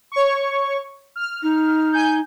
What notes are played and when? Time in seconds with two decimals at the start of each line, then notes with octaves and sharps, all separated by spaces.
0.12 C#5 C#6
1.16 F6
1.43 D#4
1.92 G#5 G6